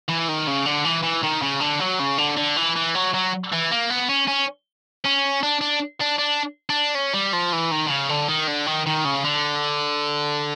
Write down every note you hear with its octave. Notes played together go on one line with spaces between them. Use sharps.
E3
D#3
C#3
D3
E3
E3
D#3
C#3
D3
F#3
C#3
D3
D3
E3
E3
F#3
F#3
E3
A#3
B3
C#4
C#4
C#4
D4
D4
D4
D4
D4
C#4
G3
F3
E3
D#3
D3
C#3
D3
D#3
D3
D#3
D#3
C#3
D3